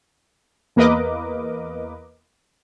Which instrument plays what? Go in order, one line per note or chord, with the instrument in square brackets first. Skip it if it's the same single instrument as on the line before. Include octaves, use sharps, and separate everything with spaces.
[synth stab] E2 A#3 A#4 B4 D#5 D6